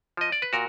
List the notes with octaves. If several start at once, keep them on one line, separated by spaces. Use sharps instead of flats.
F3 D#5
D5
B4
A#2 F#4 A#4